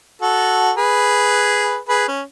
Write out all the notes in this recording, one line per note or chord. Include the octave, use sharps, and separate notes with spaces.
F#4 A4
G#4 B4
G#4 B4
C#4